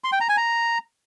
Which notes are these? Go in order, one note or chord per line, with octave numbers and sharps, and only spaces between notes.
C6
G5
A#5
G#5
A#5